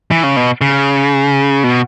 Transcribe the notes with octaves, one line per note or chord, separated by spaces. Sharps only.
E3
C#3
B2
C#3
B2